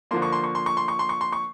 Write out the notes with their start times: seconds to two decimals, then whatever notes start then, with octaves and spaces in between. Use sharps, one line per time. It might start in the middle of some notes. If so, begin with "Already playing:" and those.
0.11 D3 F3 A#3 C6
0.22 C#6
0.32 C6
0.44 C#6
0.55 C6
0.66 C#6
0.77 C6
0.88 C#6
0.99 C6
1.09 C#6
1.21 C6
1.33 C#6